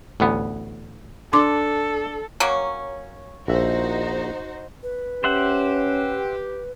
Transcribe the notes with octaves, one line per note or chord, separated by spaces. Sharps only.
A1 D2 B3
D4 A4 C6 D6
F#3 A#3 C#4
A#1 D#4 F#4 C5 E5
B4
C#4 G4 C5 E5 F#5